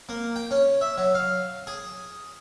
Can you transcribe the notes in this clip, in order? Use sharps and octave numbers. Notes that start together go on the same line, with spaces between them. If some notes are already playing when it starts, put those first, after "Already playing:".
A#3
G5
C#4
E5
F#3
F5
G#4